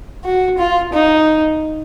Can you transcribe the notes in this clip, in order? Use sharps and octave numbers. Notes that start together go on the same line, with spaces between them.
F#4
F4
D#4